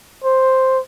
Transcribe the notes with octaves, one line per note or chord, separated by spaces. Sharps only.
C5